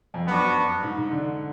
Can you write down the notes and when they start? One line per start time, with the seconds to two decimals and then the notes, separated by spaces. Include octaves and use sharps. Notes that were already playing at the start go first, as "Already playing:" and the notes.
0.14 F2
0.26 F#2 B3 D4 F#4
0.83 G#2
0.98 G#2
1.11 D3